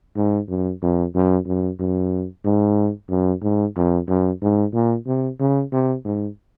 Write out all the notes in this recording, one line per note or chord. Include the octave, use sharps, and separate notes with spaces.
G#2
F#2
F2
F#2
F#2
F#2
G#2
F#2
G#2
F2
F#2
G#2
A#2
C3
C#3
C3
G#2